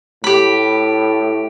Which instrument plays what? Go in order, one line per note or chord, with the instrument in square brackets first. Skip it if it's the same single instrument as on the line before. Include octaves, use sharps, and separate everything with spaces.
[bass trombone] A2 [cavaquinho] G4 B5